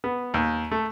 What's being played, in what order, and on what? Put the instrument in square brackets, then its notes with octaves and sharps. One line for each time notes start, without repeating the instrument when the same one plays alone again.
[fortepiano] B3
D#2
A3